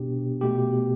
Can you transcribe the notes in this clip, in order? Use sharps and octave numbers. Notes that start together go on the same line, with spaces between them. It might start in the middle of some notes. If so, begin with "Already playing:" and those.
Already playing: B2 B3 D4 G4
B2 A3 G4